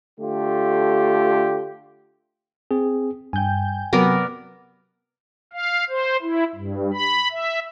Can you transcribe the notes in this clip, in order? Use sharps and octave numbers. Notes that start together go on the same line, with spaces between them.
D3 A3 F4 G4
C4 G#4
G2 G5 G#5 G6
C3 F#3 B3 A#4 D5
F5
C5
E4
G2
B5
E5